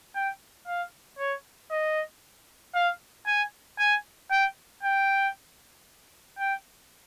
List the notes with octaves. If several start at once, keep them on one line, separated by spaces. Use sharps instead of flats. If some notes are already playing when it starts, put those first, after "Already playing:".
G5
F5
C#5
D#5
F5
G#5
G#5
G5
G5
G5